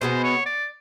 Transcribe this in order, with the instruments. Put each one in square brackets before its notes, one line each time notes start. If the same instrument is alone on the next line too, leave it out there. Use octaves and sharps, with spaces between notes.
[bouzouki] B2 G#3 B3 [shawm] C5
[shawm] C#5
D5